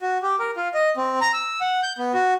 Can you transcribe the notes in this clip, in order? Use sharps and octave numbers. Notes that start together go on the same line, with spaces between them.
F#4
G4
A#4
F4
D#5
C4
A#5
E6
F#5
G6
B3
F#4